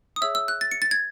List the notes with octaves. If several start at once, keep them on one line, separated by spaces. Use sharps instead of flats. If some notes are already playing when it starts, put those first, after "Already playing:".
D#6
G#4 C#5 E5 E6
E6
F#6
A6
C#7
A6
G#6